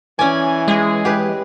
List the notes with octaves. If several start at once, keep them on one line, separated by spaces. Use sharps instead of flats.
E3 C#4 D5 G#5
G#3 G#4
E3 G4 B4